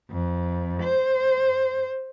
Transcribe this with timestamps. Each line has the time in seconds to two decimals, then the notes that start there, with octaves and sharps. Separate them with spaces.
0.11 F2
0.83 C5